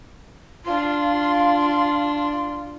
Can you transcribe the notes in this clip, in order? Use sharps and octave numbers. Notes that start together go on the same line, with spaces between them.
D4 F4 C6